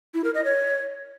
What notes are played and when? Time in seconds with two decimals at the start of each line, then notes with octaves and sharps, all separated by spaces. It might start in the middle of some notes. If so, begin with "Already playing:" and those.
0.14 E4
0.24 A#4
0.34 D#5
0.45 C#5